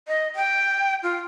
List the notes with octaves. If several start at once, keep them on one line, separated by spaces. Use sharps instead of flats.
D#5
G5
F4